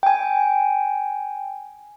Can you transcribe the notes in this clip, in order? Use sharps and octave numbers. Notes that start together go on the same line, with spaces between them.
G5 G#5